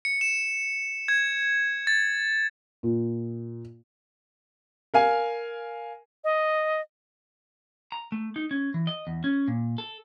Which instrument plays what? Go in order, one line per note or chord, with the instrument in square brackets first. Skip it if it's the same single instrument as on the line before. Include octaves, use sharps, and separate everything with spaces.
[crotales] C#7
E7
G#6
A6
[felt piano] A#2
[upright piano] A#4 F5 G#5
[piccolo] D#5
[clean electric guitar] A#5
A3
D#4
C#4
E3
D#5
E2
C#4
A#2
A4